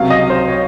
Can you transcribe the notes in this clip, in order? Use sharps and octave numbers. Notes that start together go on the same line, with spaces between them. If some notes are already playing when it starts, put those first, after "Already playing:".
Already playing: C#2 C3 F#3 F5
D#5
C5
C#5